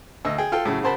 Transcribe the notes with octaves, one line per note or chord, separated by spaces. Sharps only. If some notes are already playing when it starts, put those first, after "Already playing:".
D2 D#5 E6
G#4 G5
F4 A4 G5
A2 C#3 F#3
C#3 F#4 A#4 C5 A5 B5